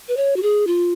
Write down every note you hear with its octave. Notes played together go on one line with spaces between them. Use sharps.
B4
C#5
F#4
G#4
F4